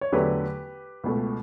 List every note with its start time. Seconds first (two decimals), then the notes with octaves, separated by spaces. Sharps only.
0.01 C#5
0.13 E2 D3 F#3 A3 G4 B4
1.04 C#2 B2 A3